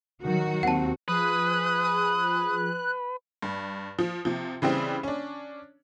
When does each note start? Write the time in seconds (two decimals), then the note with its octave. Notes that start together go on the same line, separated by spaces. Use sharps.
0.23 D#3 F#3 F#4
0.63 D#2 C4 F#5 A5
1.08 F3 G#4 B4 D#6 F#6
3.42 G2
3.99 F3
4.25 C3 F3
4.62 C#3 E3 G3 C4
5.03 C#4 D4